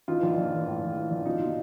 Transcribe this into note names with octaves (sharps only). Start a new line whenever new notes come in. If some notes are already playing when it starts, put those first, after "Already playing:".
E3 D#4 F4
A#1
A#1
E3
A2
A#1
E3
A#1
B2 D#4 F4
B2